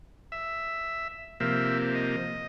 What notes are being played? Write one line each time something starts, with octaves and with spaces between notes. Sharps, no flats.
E5
C3 F3 A#3 E5
D#5